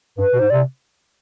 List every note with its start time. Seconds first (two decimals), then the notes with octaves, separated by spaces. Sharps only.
0.18 G2 B4
0.34 B2
0.39 G#2 C5
0.50 C3 D5